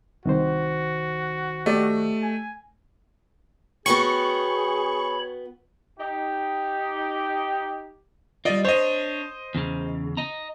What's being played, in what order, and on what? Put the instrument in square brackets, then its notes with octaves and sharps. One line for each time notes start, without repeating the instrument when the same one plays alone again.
[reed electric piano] C2 D#3 C5 [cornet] F#4
[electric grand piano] A3 [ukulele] G4 D5 D#5
[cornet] G#5
[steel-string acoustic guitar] B3 F#4 G5 [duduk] G#4 [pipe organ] C#5 B5 [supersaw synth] C#6
[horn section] D#4 G4
[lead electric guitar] G3 F4 [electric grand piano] D5 D#5
[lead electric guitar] D4 C#5 [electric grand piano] C5 D#5
[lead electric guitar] E2 C#3
D#5 A#5